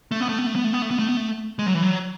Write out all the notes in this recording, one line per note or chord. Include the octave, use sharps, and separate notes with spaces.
A3
B3
A3
B3
A3
B3
A3
B3
A3
B3
A3
B3
A3
G#3
F#3
E3
F#3